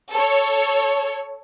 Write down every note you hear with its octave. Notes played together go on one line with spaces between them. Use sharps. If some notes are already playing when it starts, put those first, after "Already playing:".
A4 C#5